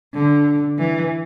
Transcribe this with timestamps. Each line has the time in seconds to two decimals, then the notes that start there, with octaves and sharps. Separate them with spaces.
0.15 D3
0.79 E3